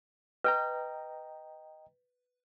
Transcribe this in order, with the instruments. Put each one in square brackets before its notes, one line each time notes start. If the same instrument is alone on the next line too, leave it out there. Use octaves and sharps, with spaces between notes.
[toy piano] B4 [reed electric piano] D#5 G5 A#5